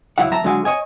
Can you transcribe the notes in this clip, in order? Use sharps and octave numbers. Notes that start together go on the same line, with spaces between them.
C#2 F#3 E4 F5 F#5
F#3 E5 A5 A#5
D3 F#3 G#3 F#4 F5 G#5
C#5 D#5 G#5